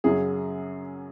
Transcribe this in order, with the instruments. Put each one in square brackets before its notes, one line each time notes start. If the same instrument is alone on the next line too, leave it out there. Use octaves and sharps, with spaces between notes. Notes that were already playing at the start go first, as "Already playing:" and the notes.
[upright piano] F#2 C#3 F#3 G#4